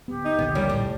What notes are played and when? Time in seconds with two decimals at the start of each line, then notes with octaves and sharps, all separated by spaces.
0.08 D1 B3 G4
0.25 D#4
0.39 A#1 D#2 D3 B3
0.55 D#3 G3 C#4
0.69 A2
0.82 F1 C2